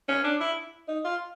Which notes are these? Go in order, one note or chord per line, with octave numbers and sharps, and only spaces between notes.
C#4
D4
E4
D#4
F4